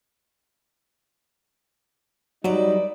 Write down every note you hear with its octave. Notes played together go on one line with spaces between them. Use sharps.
F#3 G3 D#4 B4 D5